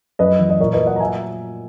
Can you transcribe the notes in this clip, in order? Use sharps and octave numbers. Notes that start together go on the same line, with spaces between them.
F#2 B4 D#5
E3
D#5
A#2 A#4 C#5
B4 D#5
F#3
D#5 F#5
A#5
E5 G#5